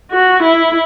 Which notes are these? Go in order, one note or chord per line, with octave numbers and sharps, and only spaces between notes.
F#4
E4